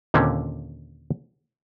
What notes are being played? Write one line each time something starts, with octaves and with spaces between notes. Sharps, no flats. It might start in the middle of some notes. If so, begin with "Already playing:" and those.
D#2 A#2 D3 C4 C#4